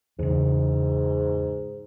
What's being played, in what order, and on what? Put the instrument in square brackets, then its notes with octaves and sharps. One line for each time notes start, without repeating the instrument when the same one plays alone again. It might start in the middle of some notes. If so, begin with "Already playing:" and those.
[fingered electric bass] E2 C#3 [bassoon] G#2